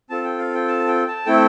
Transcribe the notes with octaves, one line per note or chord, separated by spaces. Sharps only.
C4 F4 A4 A5
G5
F5
G5
A5
G5
A5
A3 C4 E4 A4 G5